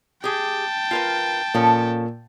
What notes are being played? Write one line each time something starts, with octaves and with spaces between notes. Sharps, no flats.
G4 G#4 G5 A5
F4 A#4 B4
A#2 F3 C#4 A4